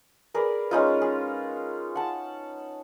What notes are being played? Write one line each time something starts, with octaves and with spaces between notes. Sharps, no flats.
G#4 A#4 B4 D5
G#3 C#4 D#4 F4
G#4
F#5 A5